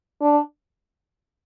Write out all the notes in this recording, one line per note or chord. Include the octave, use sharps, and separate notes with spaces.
D4